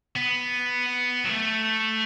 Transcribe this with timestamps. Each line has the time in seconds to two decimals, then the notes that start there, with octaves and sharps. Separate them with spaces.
0.16 B3
1.24 F#3
1.29 A3